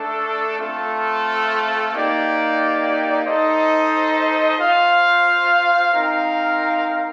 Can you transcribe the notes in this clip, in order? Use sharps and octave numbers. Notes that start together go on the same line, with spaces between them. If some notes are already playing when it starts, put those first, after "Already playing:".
Already playing: A3 D4 A4
A3 C4 F4 A4
A#3 D#4 G4 D5 G5
D#4 A4 C5 D#5
F4 C5 F5
C4 D#4 A#4 F5